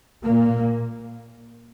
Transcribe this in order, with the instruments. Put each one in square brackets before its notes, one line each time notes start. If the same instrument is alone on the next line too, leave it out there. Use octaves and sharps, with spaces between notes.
[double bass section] A#2 A#3